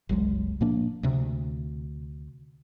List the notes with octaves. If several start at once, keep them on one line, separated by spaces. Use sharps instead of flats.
F#1 C2 F#3 G#3
A#2 F3 A#3 D4
D2 C3